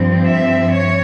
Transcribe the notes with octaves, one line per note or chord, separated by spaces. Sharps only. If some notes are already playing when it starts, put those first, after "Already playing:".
Already playing: G2 F3 C4
E5
C#5